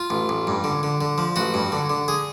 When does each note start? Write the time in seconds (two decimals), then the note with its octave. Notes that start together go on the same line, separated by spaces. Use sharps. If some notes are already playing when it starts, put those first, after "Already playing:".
Already playing: F4
0.10 A1
0.29 A1
0.47 G2
0.64 D3
0.83 D3
1.01 D3
1.18 F3
1.36 A1 F#4
1.54 G2
1.72 D3
1.90 D3
2.08 G#4